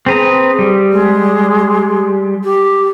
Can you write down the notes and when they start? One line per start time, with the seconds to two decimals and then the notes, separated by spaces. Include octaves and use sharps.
0.06 C4 G#4 B4 A#5
0.59 G3
0.92 G#3
2.44 G4